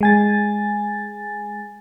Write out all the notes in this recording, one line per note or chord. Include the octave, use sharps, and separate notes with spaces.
G#3 G#5 A6